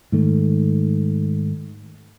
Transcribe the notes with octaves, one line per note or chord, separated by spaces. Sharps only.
G#2 D#3 A3